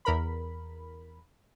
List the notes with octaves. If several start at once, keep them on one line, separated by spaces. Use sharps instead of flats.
E2 A#4 B5